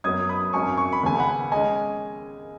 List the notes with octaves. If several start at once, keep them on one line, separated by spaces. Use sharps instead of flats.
F#2 F#3 B3 D#6 G#6
B5 D#6
G#1 F#2 F#3 C#4 G#5 C#6
C#6
B5
D#2 C#3 B3 G#5
F#5 B5
G#3 C#4 D#5 G#5